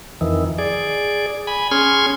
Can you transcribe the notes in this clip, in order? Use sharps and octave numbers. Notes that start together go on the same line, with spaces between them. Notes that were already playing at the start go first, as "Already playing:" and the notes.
F2 D#3 E3
G#4 D5
G#5 B5
C#4 G#4 C6 F6 G#6